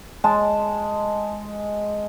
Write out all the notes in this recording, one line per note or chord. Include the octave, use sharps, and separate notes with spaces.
G#3 A5